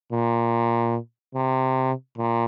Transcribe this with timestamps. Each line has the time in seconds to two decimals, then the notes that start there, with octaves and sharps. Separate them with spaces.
0.12 A#2
1.35 C3
2.17 A#2